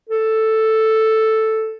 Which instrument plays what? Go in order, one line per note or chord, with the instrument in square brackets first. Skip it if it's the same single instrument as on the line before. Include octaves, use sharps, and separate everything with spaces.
[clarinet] A4